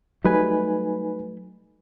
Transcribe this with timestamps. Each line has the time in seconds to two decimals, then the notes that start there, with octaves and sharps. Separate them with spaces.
0.25 F#3 G3 A3 D#4 B4 G#5